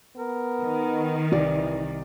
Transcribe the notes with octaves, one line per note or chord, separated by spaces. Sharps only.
B3 A#4
D#3
C2 E3 D5